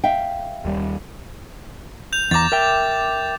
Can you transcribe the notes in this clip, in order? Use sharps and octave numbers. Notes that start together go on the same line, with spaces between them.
E5 F5 G5
D#2 G3
G6 F7
E2 A#5 D6 A6
A#4 E5 G5